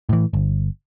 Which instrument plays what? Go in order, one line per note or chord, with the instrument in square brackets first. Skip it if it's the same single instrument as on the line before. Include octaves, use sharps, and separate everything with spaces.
[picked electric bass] A2 E3
G1